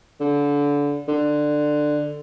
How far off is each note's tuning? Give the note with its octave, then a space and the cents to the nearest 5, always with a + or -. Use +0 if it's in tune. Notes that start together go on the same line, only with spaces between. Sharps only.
D3 -25
D3 +15